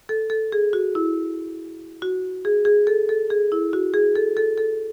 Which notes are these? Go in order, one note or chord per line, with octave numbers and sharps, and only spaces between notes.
A4
A4
G#4
F#4
E4
F#4
G#4
G#4
A4
A4
G#4
E4
F#4
G#4
A4
A4
A4